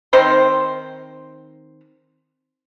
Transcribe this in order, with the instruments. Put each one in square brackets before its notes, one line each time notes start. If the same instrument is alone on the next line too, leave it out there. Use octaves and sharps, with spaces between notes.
[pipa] D#3 C4 C5 C6